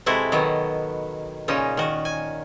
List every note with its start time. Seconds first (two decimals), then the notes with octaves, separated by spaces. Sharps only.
0.06 C3 G#3 E4 F#4 A4
0.32 B2 D#3 F#3 B3
1.48 A#2 C#3 C#4 D#4
1.77 D#3 F#4
2.05 G#5